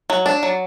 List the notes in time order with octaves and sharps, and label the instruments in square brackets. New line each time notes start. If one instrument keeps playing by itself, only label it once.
[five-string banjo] F#3
D4
F#3